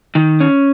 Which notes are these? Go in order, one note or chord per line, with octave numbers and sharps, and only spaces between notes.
D#3
C#4